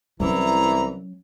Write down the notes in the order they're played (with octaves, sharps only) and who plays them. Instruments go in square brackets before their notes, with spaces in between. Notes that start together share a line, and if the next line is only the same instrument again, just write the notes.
[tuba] C2 [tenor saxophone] E3 [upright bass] F#3 C#4 [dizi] A#5